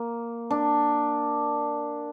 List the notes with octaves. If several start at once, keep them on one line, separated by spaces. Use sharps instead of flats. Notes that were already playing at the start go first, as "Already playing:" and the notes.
Already playing: A#3
D4